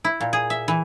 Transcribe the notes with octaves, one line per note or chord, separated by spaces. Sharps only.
E4
A#2
G#4
E5
E3